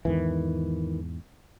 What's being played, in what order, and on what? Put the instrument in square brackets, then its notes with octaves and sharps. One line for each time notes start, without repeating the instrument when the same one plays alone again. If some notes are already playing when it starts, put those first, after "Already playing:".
[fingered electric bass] E2 G#2 [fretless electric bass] D#3 E3